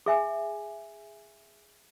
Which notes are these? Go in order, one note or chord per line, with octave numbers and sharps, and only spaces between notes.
G#4 E5 G#5